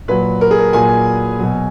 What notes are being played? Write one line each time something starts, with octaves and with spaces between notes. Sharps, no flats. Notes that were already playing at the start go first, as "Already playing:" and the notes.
A#2 F#3 B4
A#4
G#4
A#4
A#2 F#3 G#5
B2 F#3